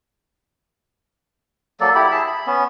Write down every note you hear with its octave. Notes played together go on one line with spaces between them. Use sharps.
F#3 A#3 A4 D5
E4 G4 B5
G#4 E5 A5
B5
B3 C#4